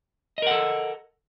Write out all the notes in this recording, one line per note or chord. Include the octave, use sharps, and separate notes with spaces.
A4 A#4 D#5 F#5